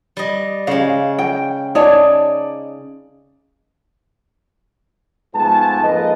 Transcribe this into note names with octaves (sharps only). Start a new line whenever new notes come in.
G3 D#5
C#3 G#3 F5
G5
D#4 C#5 D5 G#5 A5
G#2 F3 A3 B3 G#5 A5
F2 G#3 A#3 B4 D#5